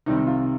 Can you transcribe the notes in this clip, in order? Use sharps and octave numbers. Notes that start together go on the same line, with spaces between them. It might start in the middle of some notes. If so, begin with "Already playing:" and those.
C2 C3 D#3 G3 C4 D#4
F4